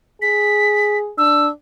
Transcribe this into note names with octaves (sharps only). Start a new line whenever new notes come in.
G#4 B6
D4 E6